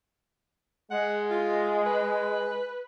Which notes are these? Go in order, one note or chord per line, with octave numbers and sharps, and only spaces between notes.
G#3 F#5
F4
B4